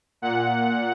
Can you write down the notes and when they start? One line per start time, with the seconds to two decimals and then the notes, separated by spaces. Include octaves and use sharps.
0.22 A#2 F#5